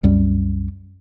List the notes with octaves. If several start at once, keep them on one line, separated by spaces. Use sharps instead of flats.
C2 F#2 G3